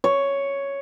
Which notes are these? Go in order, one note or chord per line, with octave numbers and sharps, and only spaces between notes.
C#5